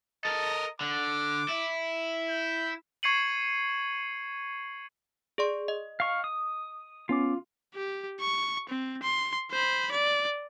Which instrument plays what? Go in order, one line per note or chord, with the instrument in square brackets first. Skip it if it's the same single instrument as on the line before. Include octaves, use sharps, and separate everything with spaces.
[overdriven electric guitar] A4 A#4 [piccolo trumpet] D#5
[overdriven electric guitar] D3 [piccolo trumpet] D6
[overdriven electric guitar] E4
[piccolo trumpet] G6
[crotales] C#6 G#6 C7 C#7 D#7 F#7
[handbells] G#4 D5 C6
D#5
[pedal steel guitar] F5 C#6
D#6
[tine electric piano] B3 C#4 D6 [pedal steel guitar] F4
[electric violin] G4
C#6
C4
C6
C5 B5
D5